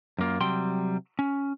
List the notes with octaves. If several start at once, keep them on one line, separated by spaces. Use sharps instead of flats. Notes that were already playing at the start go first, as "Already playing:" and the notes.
F#2 A#3 F4
C3 F#3 G3 G5 C6
C#4